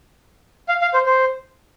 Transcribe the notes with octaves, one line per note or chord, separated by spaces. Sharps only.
F5
F5
C5
C5